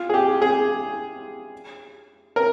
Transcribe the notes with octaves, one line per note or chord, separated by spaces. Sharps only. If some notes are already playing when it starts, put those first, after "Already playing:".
Already playing: F4
G#4
G4
G#4
A#4